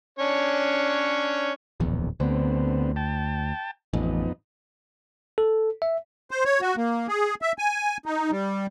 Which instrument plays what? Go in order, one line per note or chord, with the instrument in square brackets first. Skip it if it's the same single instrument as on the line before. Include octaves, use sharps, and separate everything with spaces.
[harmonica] C#4 D4 C#5
[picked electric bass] D1 A#1 E2
[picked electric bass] D2 [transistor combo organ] D3 B3 C4
[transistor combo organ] G5 A5
[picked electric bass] A1 [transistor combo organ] F2 B3 D#4
[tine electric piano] A4
E5
[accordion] C5
C#5
F#4
A#3
G#4
E5
G#5
D#4
G3